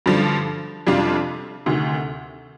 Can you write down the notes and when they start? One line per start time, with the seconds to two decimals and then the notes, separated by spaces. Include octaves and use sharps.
0.06 G2 D3 F3
0.87 F2 C3 G3 D4 F4
1.66 D2 C3 D#3